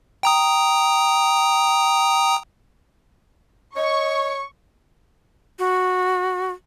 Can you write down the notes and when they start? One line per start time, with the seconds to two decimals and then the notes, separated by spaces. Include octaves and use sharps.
0.23 G5 A#5 D#6
3.76 C#5 D#5 C#6
5.59 F#4